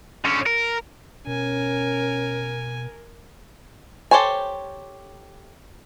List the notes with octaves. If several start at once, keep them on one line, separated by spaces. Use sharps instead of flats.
D3 C#4
A#4
B2 C#4 A#4 G#5
G4 A4 C5 C#5 G#5